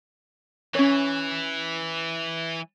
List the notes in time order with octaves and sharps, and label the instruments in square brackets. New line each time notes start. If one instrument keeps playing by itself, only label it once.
[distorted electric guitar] E3 [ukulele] C#4 C#5